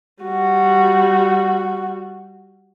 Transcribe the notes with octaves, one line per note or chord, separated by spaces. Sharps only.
G3 F#4